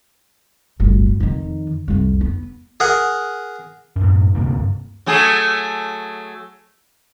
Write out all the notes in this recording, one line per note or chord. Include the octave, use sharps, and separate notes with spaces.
D1 G1
F2 D#3
C2 F2
B3
G#4 A#4 F#5
F#2 A2
D2 G2 C3 A#3
F#3 A3 G#4